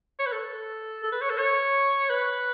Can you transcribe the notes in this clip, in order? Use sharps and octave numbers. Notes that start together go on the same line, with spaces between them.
C#5
B4
A4
A4
B4
C#5
A4
C#5
B4